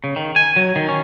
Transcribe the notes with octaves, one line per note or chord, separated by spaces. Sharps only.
C#3
D#3
G#5
F#3
D#3
C#4